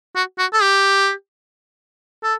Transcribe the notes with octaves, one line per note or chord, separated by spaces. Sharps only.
F#4
F#4
A4
G4
A4